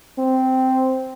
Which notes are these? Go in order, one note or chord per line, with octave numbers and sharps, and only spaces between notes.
C4